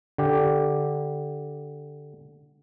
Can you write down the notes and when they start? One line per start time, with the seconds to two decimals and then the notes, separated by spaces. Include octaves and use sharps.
0.18 D3 G4